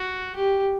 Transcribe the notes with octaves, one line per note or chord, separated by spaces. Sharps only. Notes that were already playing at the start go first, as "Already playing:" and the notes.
Already playing: F#4
G4